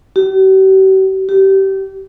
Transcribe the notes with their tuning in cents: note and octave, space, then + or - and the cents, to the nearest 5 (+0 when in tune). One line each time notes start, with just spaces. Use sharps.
G4 -45
G4 -25